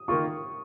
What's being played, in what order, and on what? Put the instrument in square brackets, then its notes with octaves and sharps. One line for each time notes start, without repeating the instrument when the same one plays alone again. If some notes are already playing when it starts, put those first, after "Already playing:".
Already playing: [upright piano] D#6
[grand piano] D#3 A#3 F4 [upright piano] C#6